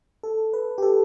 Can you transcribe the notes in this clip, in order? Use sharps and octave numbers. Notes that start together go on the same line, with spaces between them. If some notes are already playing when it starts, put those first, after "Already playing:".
A4
B4
G4
A4